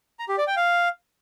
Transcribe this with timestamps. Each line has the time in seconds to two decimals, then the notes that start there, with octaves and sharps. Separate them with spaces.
0.19 A#5
0.29 G4
0.38 D5
0.47 G5
0.56 F5